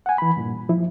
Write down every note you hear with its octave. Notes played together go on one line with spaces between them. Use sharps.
F#5 G#5
E3 B5
G2 A#2
F3 E4